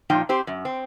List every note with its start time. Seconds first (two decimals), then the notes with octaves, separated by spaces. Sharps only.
0.10 A#2 F3 D#4 F4 G5
0.29 C4 G4 C5
0.47 F#2
0.65 C4